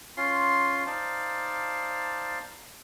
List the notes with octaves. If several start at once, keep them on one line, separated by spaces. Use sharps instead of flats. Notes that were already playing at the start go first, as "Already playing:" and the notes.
C#4 F4 C6
D#4 C5 D5 F5 A5